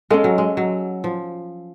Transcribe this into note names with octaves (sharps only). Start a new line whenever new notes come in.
G#3 C#4 F4 A4 F5
F#3
G#3
F#3
F3